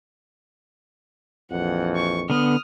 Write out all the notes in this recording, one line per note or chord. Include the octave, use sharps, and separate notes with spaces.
A#1 F2 E3 F#5
C#6
D3 B3 D#6 F6